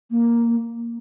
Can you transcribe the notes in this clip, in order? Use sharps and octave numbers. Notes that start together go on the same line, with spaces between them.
A#3